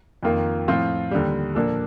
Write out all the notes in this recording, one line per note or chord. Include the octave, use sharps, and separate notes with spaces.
F2 D#3 A#3 F4
A2 F3 C4 F4
D#2 D3 G3
A#2 F3 A#3 D4 A4